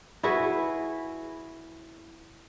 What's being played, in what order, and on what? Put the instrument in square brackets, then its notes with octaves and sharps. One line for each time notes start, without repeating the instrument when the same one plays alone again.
[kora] E4 F#4 G#4 B4